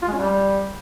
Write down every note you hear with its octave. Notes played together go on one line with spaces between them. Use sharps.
F4
G#3
C#4
G3